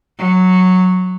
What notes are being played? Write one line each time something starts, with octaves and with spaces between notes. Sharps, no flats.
F#3